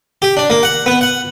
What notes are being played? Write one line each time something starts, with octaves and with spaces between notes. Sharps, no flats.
G4
D4
A#3
F#5
B3
F#5